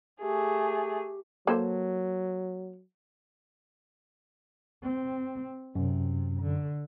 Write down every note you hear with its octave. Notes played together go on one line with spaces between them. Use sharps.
A3 G4 G#4
F#3 A#3 A4 C5
C4
F#2 C3
D3